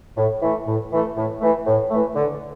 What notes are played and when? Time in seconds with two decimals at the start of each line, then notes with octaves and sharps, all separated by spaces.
0.17 A2
0.42 E3 A3
0.67 A2
0.92 E3 A3
1.17 A2
1.41 E3 A3
1.67 A2
1.91 E3 A3
2.15 D3